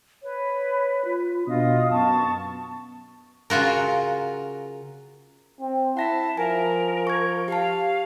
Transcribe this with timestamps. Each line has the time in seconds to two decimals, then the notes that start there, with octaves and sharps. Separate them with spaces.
0.23 B4 C#5
1.05 F4
1.47 B2 D4 F4 D#5 D#6
1.90 F#2 B3 A5 C#6
3.50 C#3 F#3 F4 F#4 A#4
5.60 C4
5.97 E4 F#5 A5 A#6 B6
6.37 F3 A#4 G#5
7.07 C#6 G#6
7.48 G4 F5 A5